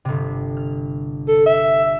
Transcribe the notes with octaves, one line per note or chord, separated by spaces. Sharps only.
G1 C3
F6
A4
E5